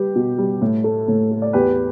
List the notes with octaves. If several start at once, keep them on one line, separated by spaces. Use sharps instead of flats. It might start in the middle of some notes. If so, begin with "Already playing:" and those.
Already playing: G3 G4 B4
B2
G3
A2
A3
A2
A3
D5
E2 G4 B4